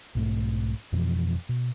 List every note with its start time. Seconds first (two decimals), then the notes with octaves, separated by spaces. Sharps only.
0.15 B1 G#2 A3
0.92 F2 B2 E3 F3
1.49 B2